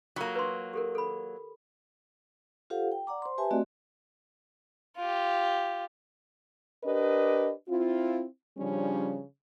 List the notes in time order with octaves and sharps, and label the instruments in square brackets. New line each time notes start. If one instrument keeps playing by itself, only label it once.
[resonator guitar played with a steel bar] F#3 A#3 [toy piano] F4 D#6
[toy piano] B4 C6
G4 A4 A#4
A4 B5
[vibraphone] F4 G4 A4 C5 F5 F#5
G5
D5 F#5 A#5 D6
C5 C6
G4 B4 E5 G#5 A5
A3 C4 F#4 D5 D#5
[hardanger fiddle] F4 G4
[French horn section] D4 G4 A#4 B4 D#5
C4 E4 F4
C#3 F3 G3 C#4 D4